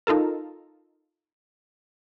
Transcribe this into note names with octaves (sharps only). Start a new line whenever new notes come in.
D#4 F4 A4 A#4